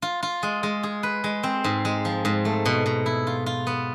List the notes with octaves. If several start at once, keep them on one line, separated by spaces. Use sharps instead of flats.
F4
F4
G#3
G#3
G#4
B4
G#3
C4
G#2
G#3
F3
G#2
A3
B2
B2
E4
F4
F4
B3